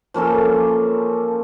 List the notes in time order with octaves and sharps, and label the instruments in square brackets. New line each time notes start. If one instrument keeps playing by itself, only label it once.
[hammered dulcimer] F3 A#3 C#4 A4